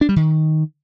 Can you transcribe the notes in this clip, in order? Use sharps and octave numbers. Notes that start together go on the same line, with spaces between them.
D4
G3
D#3